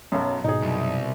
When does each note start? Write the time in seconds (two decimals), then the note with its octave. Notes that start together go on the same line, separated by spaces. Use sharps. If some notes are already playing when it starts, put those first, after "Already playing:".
0.12 B1 F#2
0.44 G#1 G#2 B2 D#4 G#4
0.62 C2 F#2